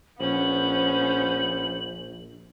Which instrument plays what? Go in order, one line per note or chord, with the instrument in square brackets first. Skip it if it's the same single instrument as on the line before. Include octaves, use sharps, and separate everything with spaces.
[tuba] A#1 [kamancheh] B3 C#4 [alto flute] C5 [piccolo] F#7